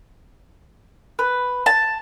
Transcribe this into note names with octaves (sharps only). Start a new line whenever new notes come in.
B4
A5